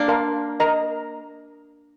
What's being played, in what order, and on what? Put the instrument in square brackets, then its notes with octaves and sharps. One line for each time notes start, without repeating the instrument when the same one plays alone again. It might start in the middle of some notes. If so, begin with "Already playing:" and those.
Already playing: [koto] A#3 D4
[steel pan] A#4 F5 A5 C6
A#4 D#5 A#5